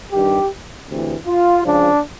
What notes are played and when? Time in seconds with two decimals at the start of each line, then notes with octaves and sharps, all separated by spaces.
0.13 G2 D#3 G4
0.88 D2 C3 E3
1.26 F4
1.64 C#2 C#3 F3 D4